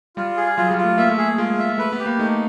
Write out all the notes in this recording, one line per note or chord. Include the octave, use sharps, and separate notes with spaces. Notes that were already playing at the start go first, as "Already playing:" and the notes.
G3 F4
G#4
F#3 F4
G3
F4
A3
A#3 E5
A3
G#4
A#3
G#3 F4
E5
A3 B4
B3
G4
A#3
A3 D#4